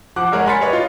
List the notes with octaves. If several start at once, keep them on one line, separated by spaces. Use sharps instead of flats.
F3 F#5 D6 F#6
F#1 G#3 A#4 C#5 F#5
G#5 B5 C6 A6 B6 C#7
G4 B4 C#5 D#5
F4